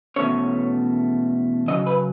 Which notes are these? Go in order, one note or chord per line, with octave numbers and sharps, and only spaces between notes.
E2 B2 A3 C#4 C#5
F#2 C#3 F#3 D#5
B4